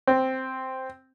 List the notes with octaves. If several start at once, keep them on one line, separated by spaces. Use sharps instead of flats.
C4